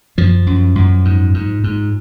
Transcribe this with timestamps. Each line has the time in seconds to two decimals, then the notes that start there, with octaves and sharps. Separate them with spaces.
0.18 F#2 F3
0.47 F#2
0.75 F#2
1.05 G#2
1.34 G#2
1.64 G#2